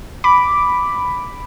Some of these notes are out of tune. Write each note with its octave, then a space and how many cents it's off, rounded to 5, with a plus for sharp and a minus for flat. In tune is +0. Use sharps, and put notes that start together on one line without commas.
B5 +5 D6 +0